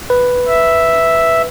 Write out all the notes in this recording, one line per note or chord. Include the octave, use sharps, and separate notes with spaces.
B4
E5